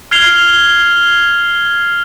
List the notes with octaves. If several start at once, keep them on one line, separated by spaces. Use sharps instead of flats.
F6 G#6 C7 F7 G7